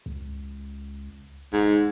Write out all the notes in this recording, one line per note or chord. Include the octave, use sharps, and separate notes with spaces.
C#2
E1 G#2